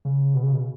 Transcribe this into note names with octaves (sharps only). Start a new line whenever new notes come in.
C#3
B2
C#3
B2